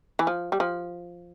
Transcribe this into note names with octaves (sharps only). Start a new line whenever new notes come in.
E3
F3
G3
F3